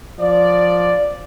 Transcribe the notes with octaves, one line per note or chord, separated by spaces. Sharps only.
F3 D5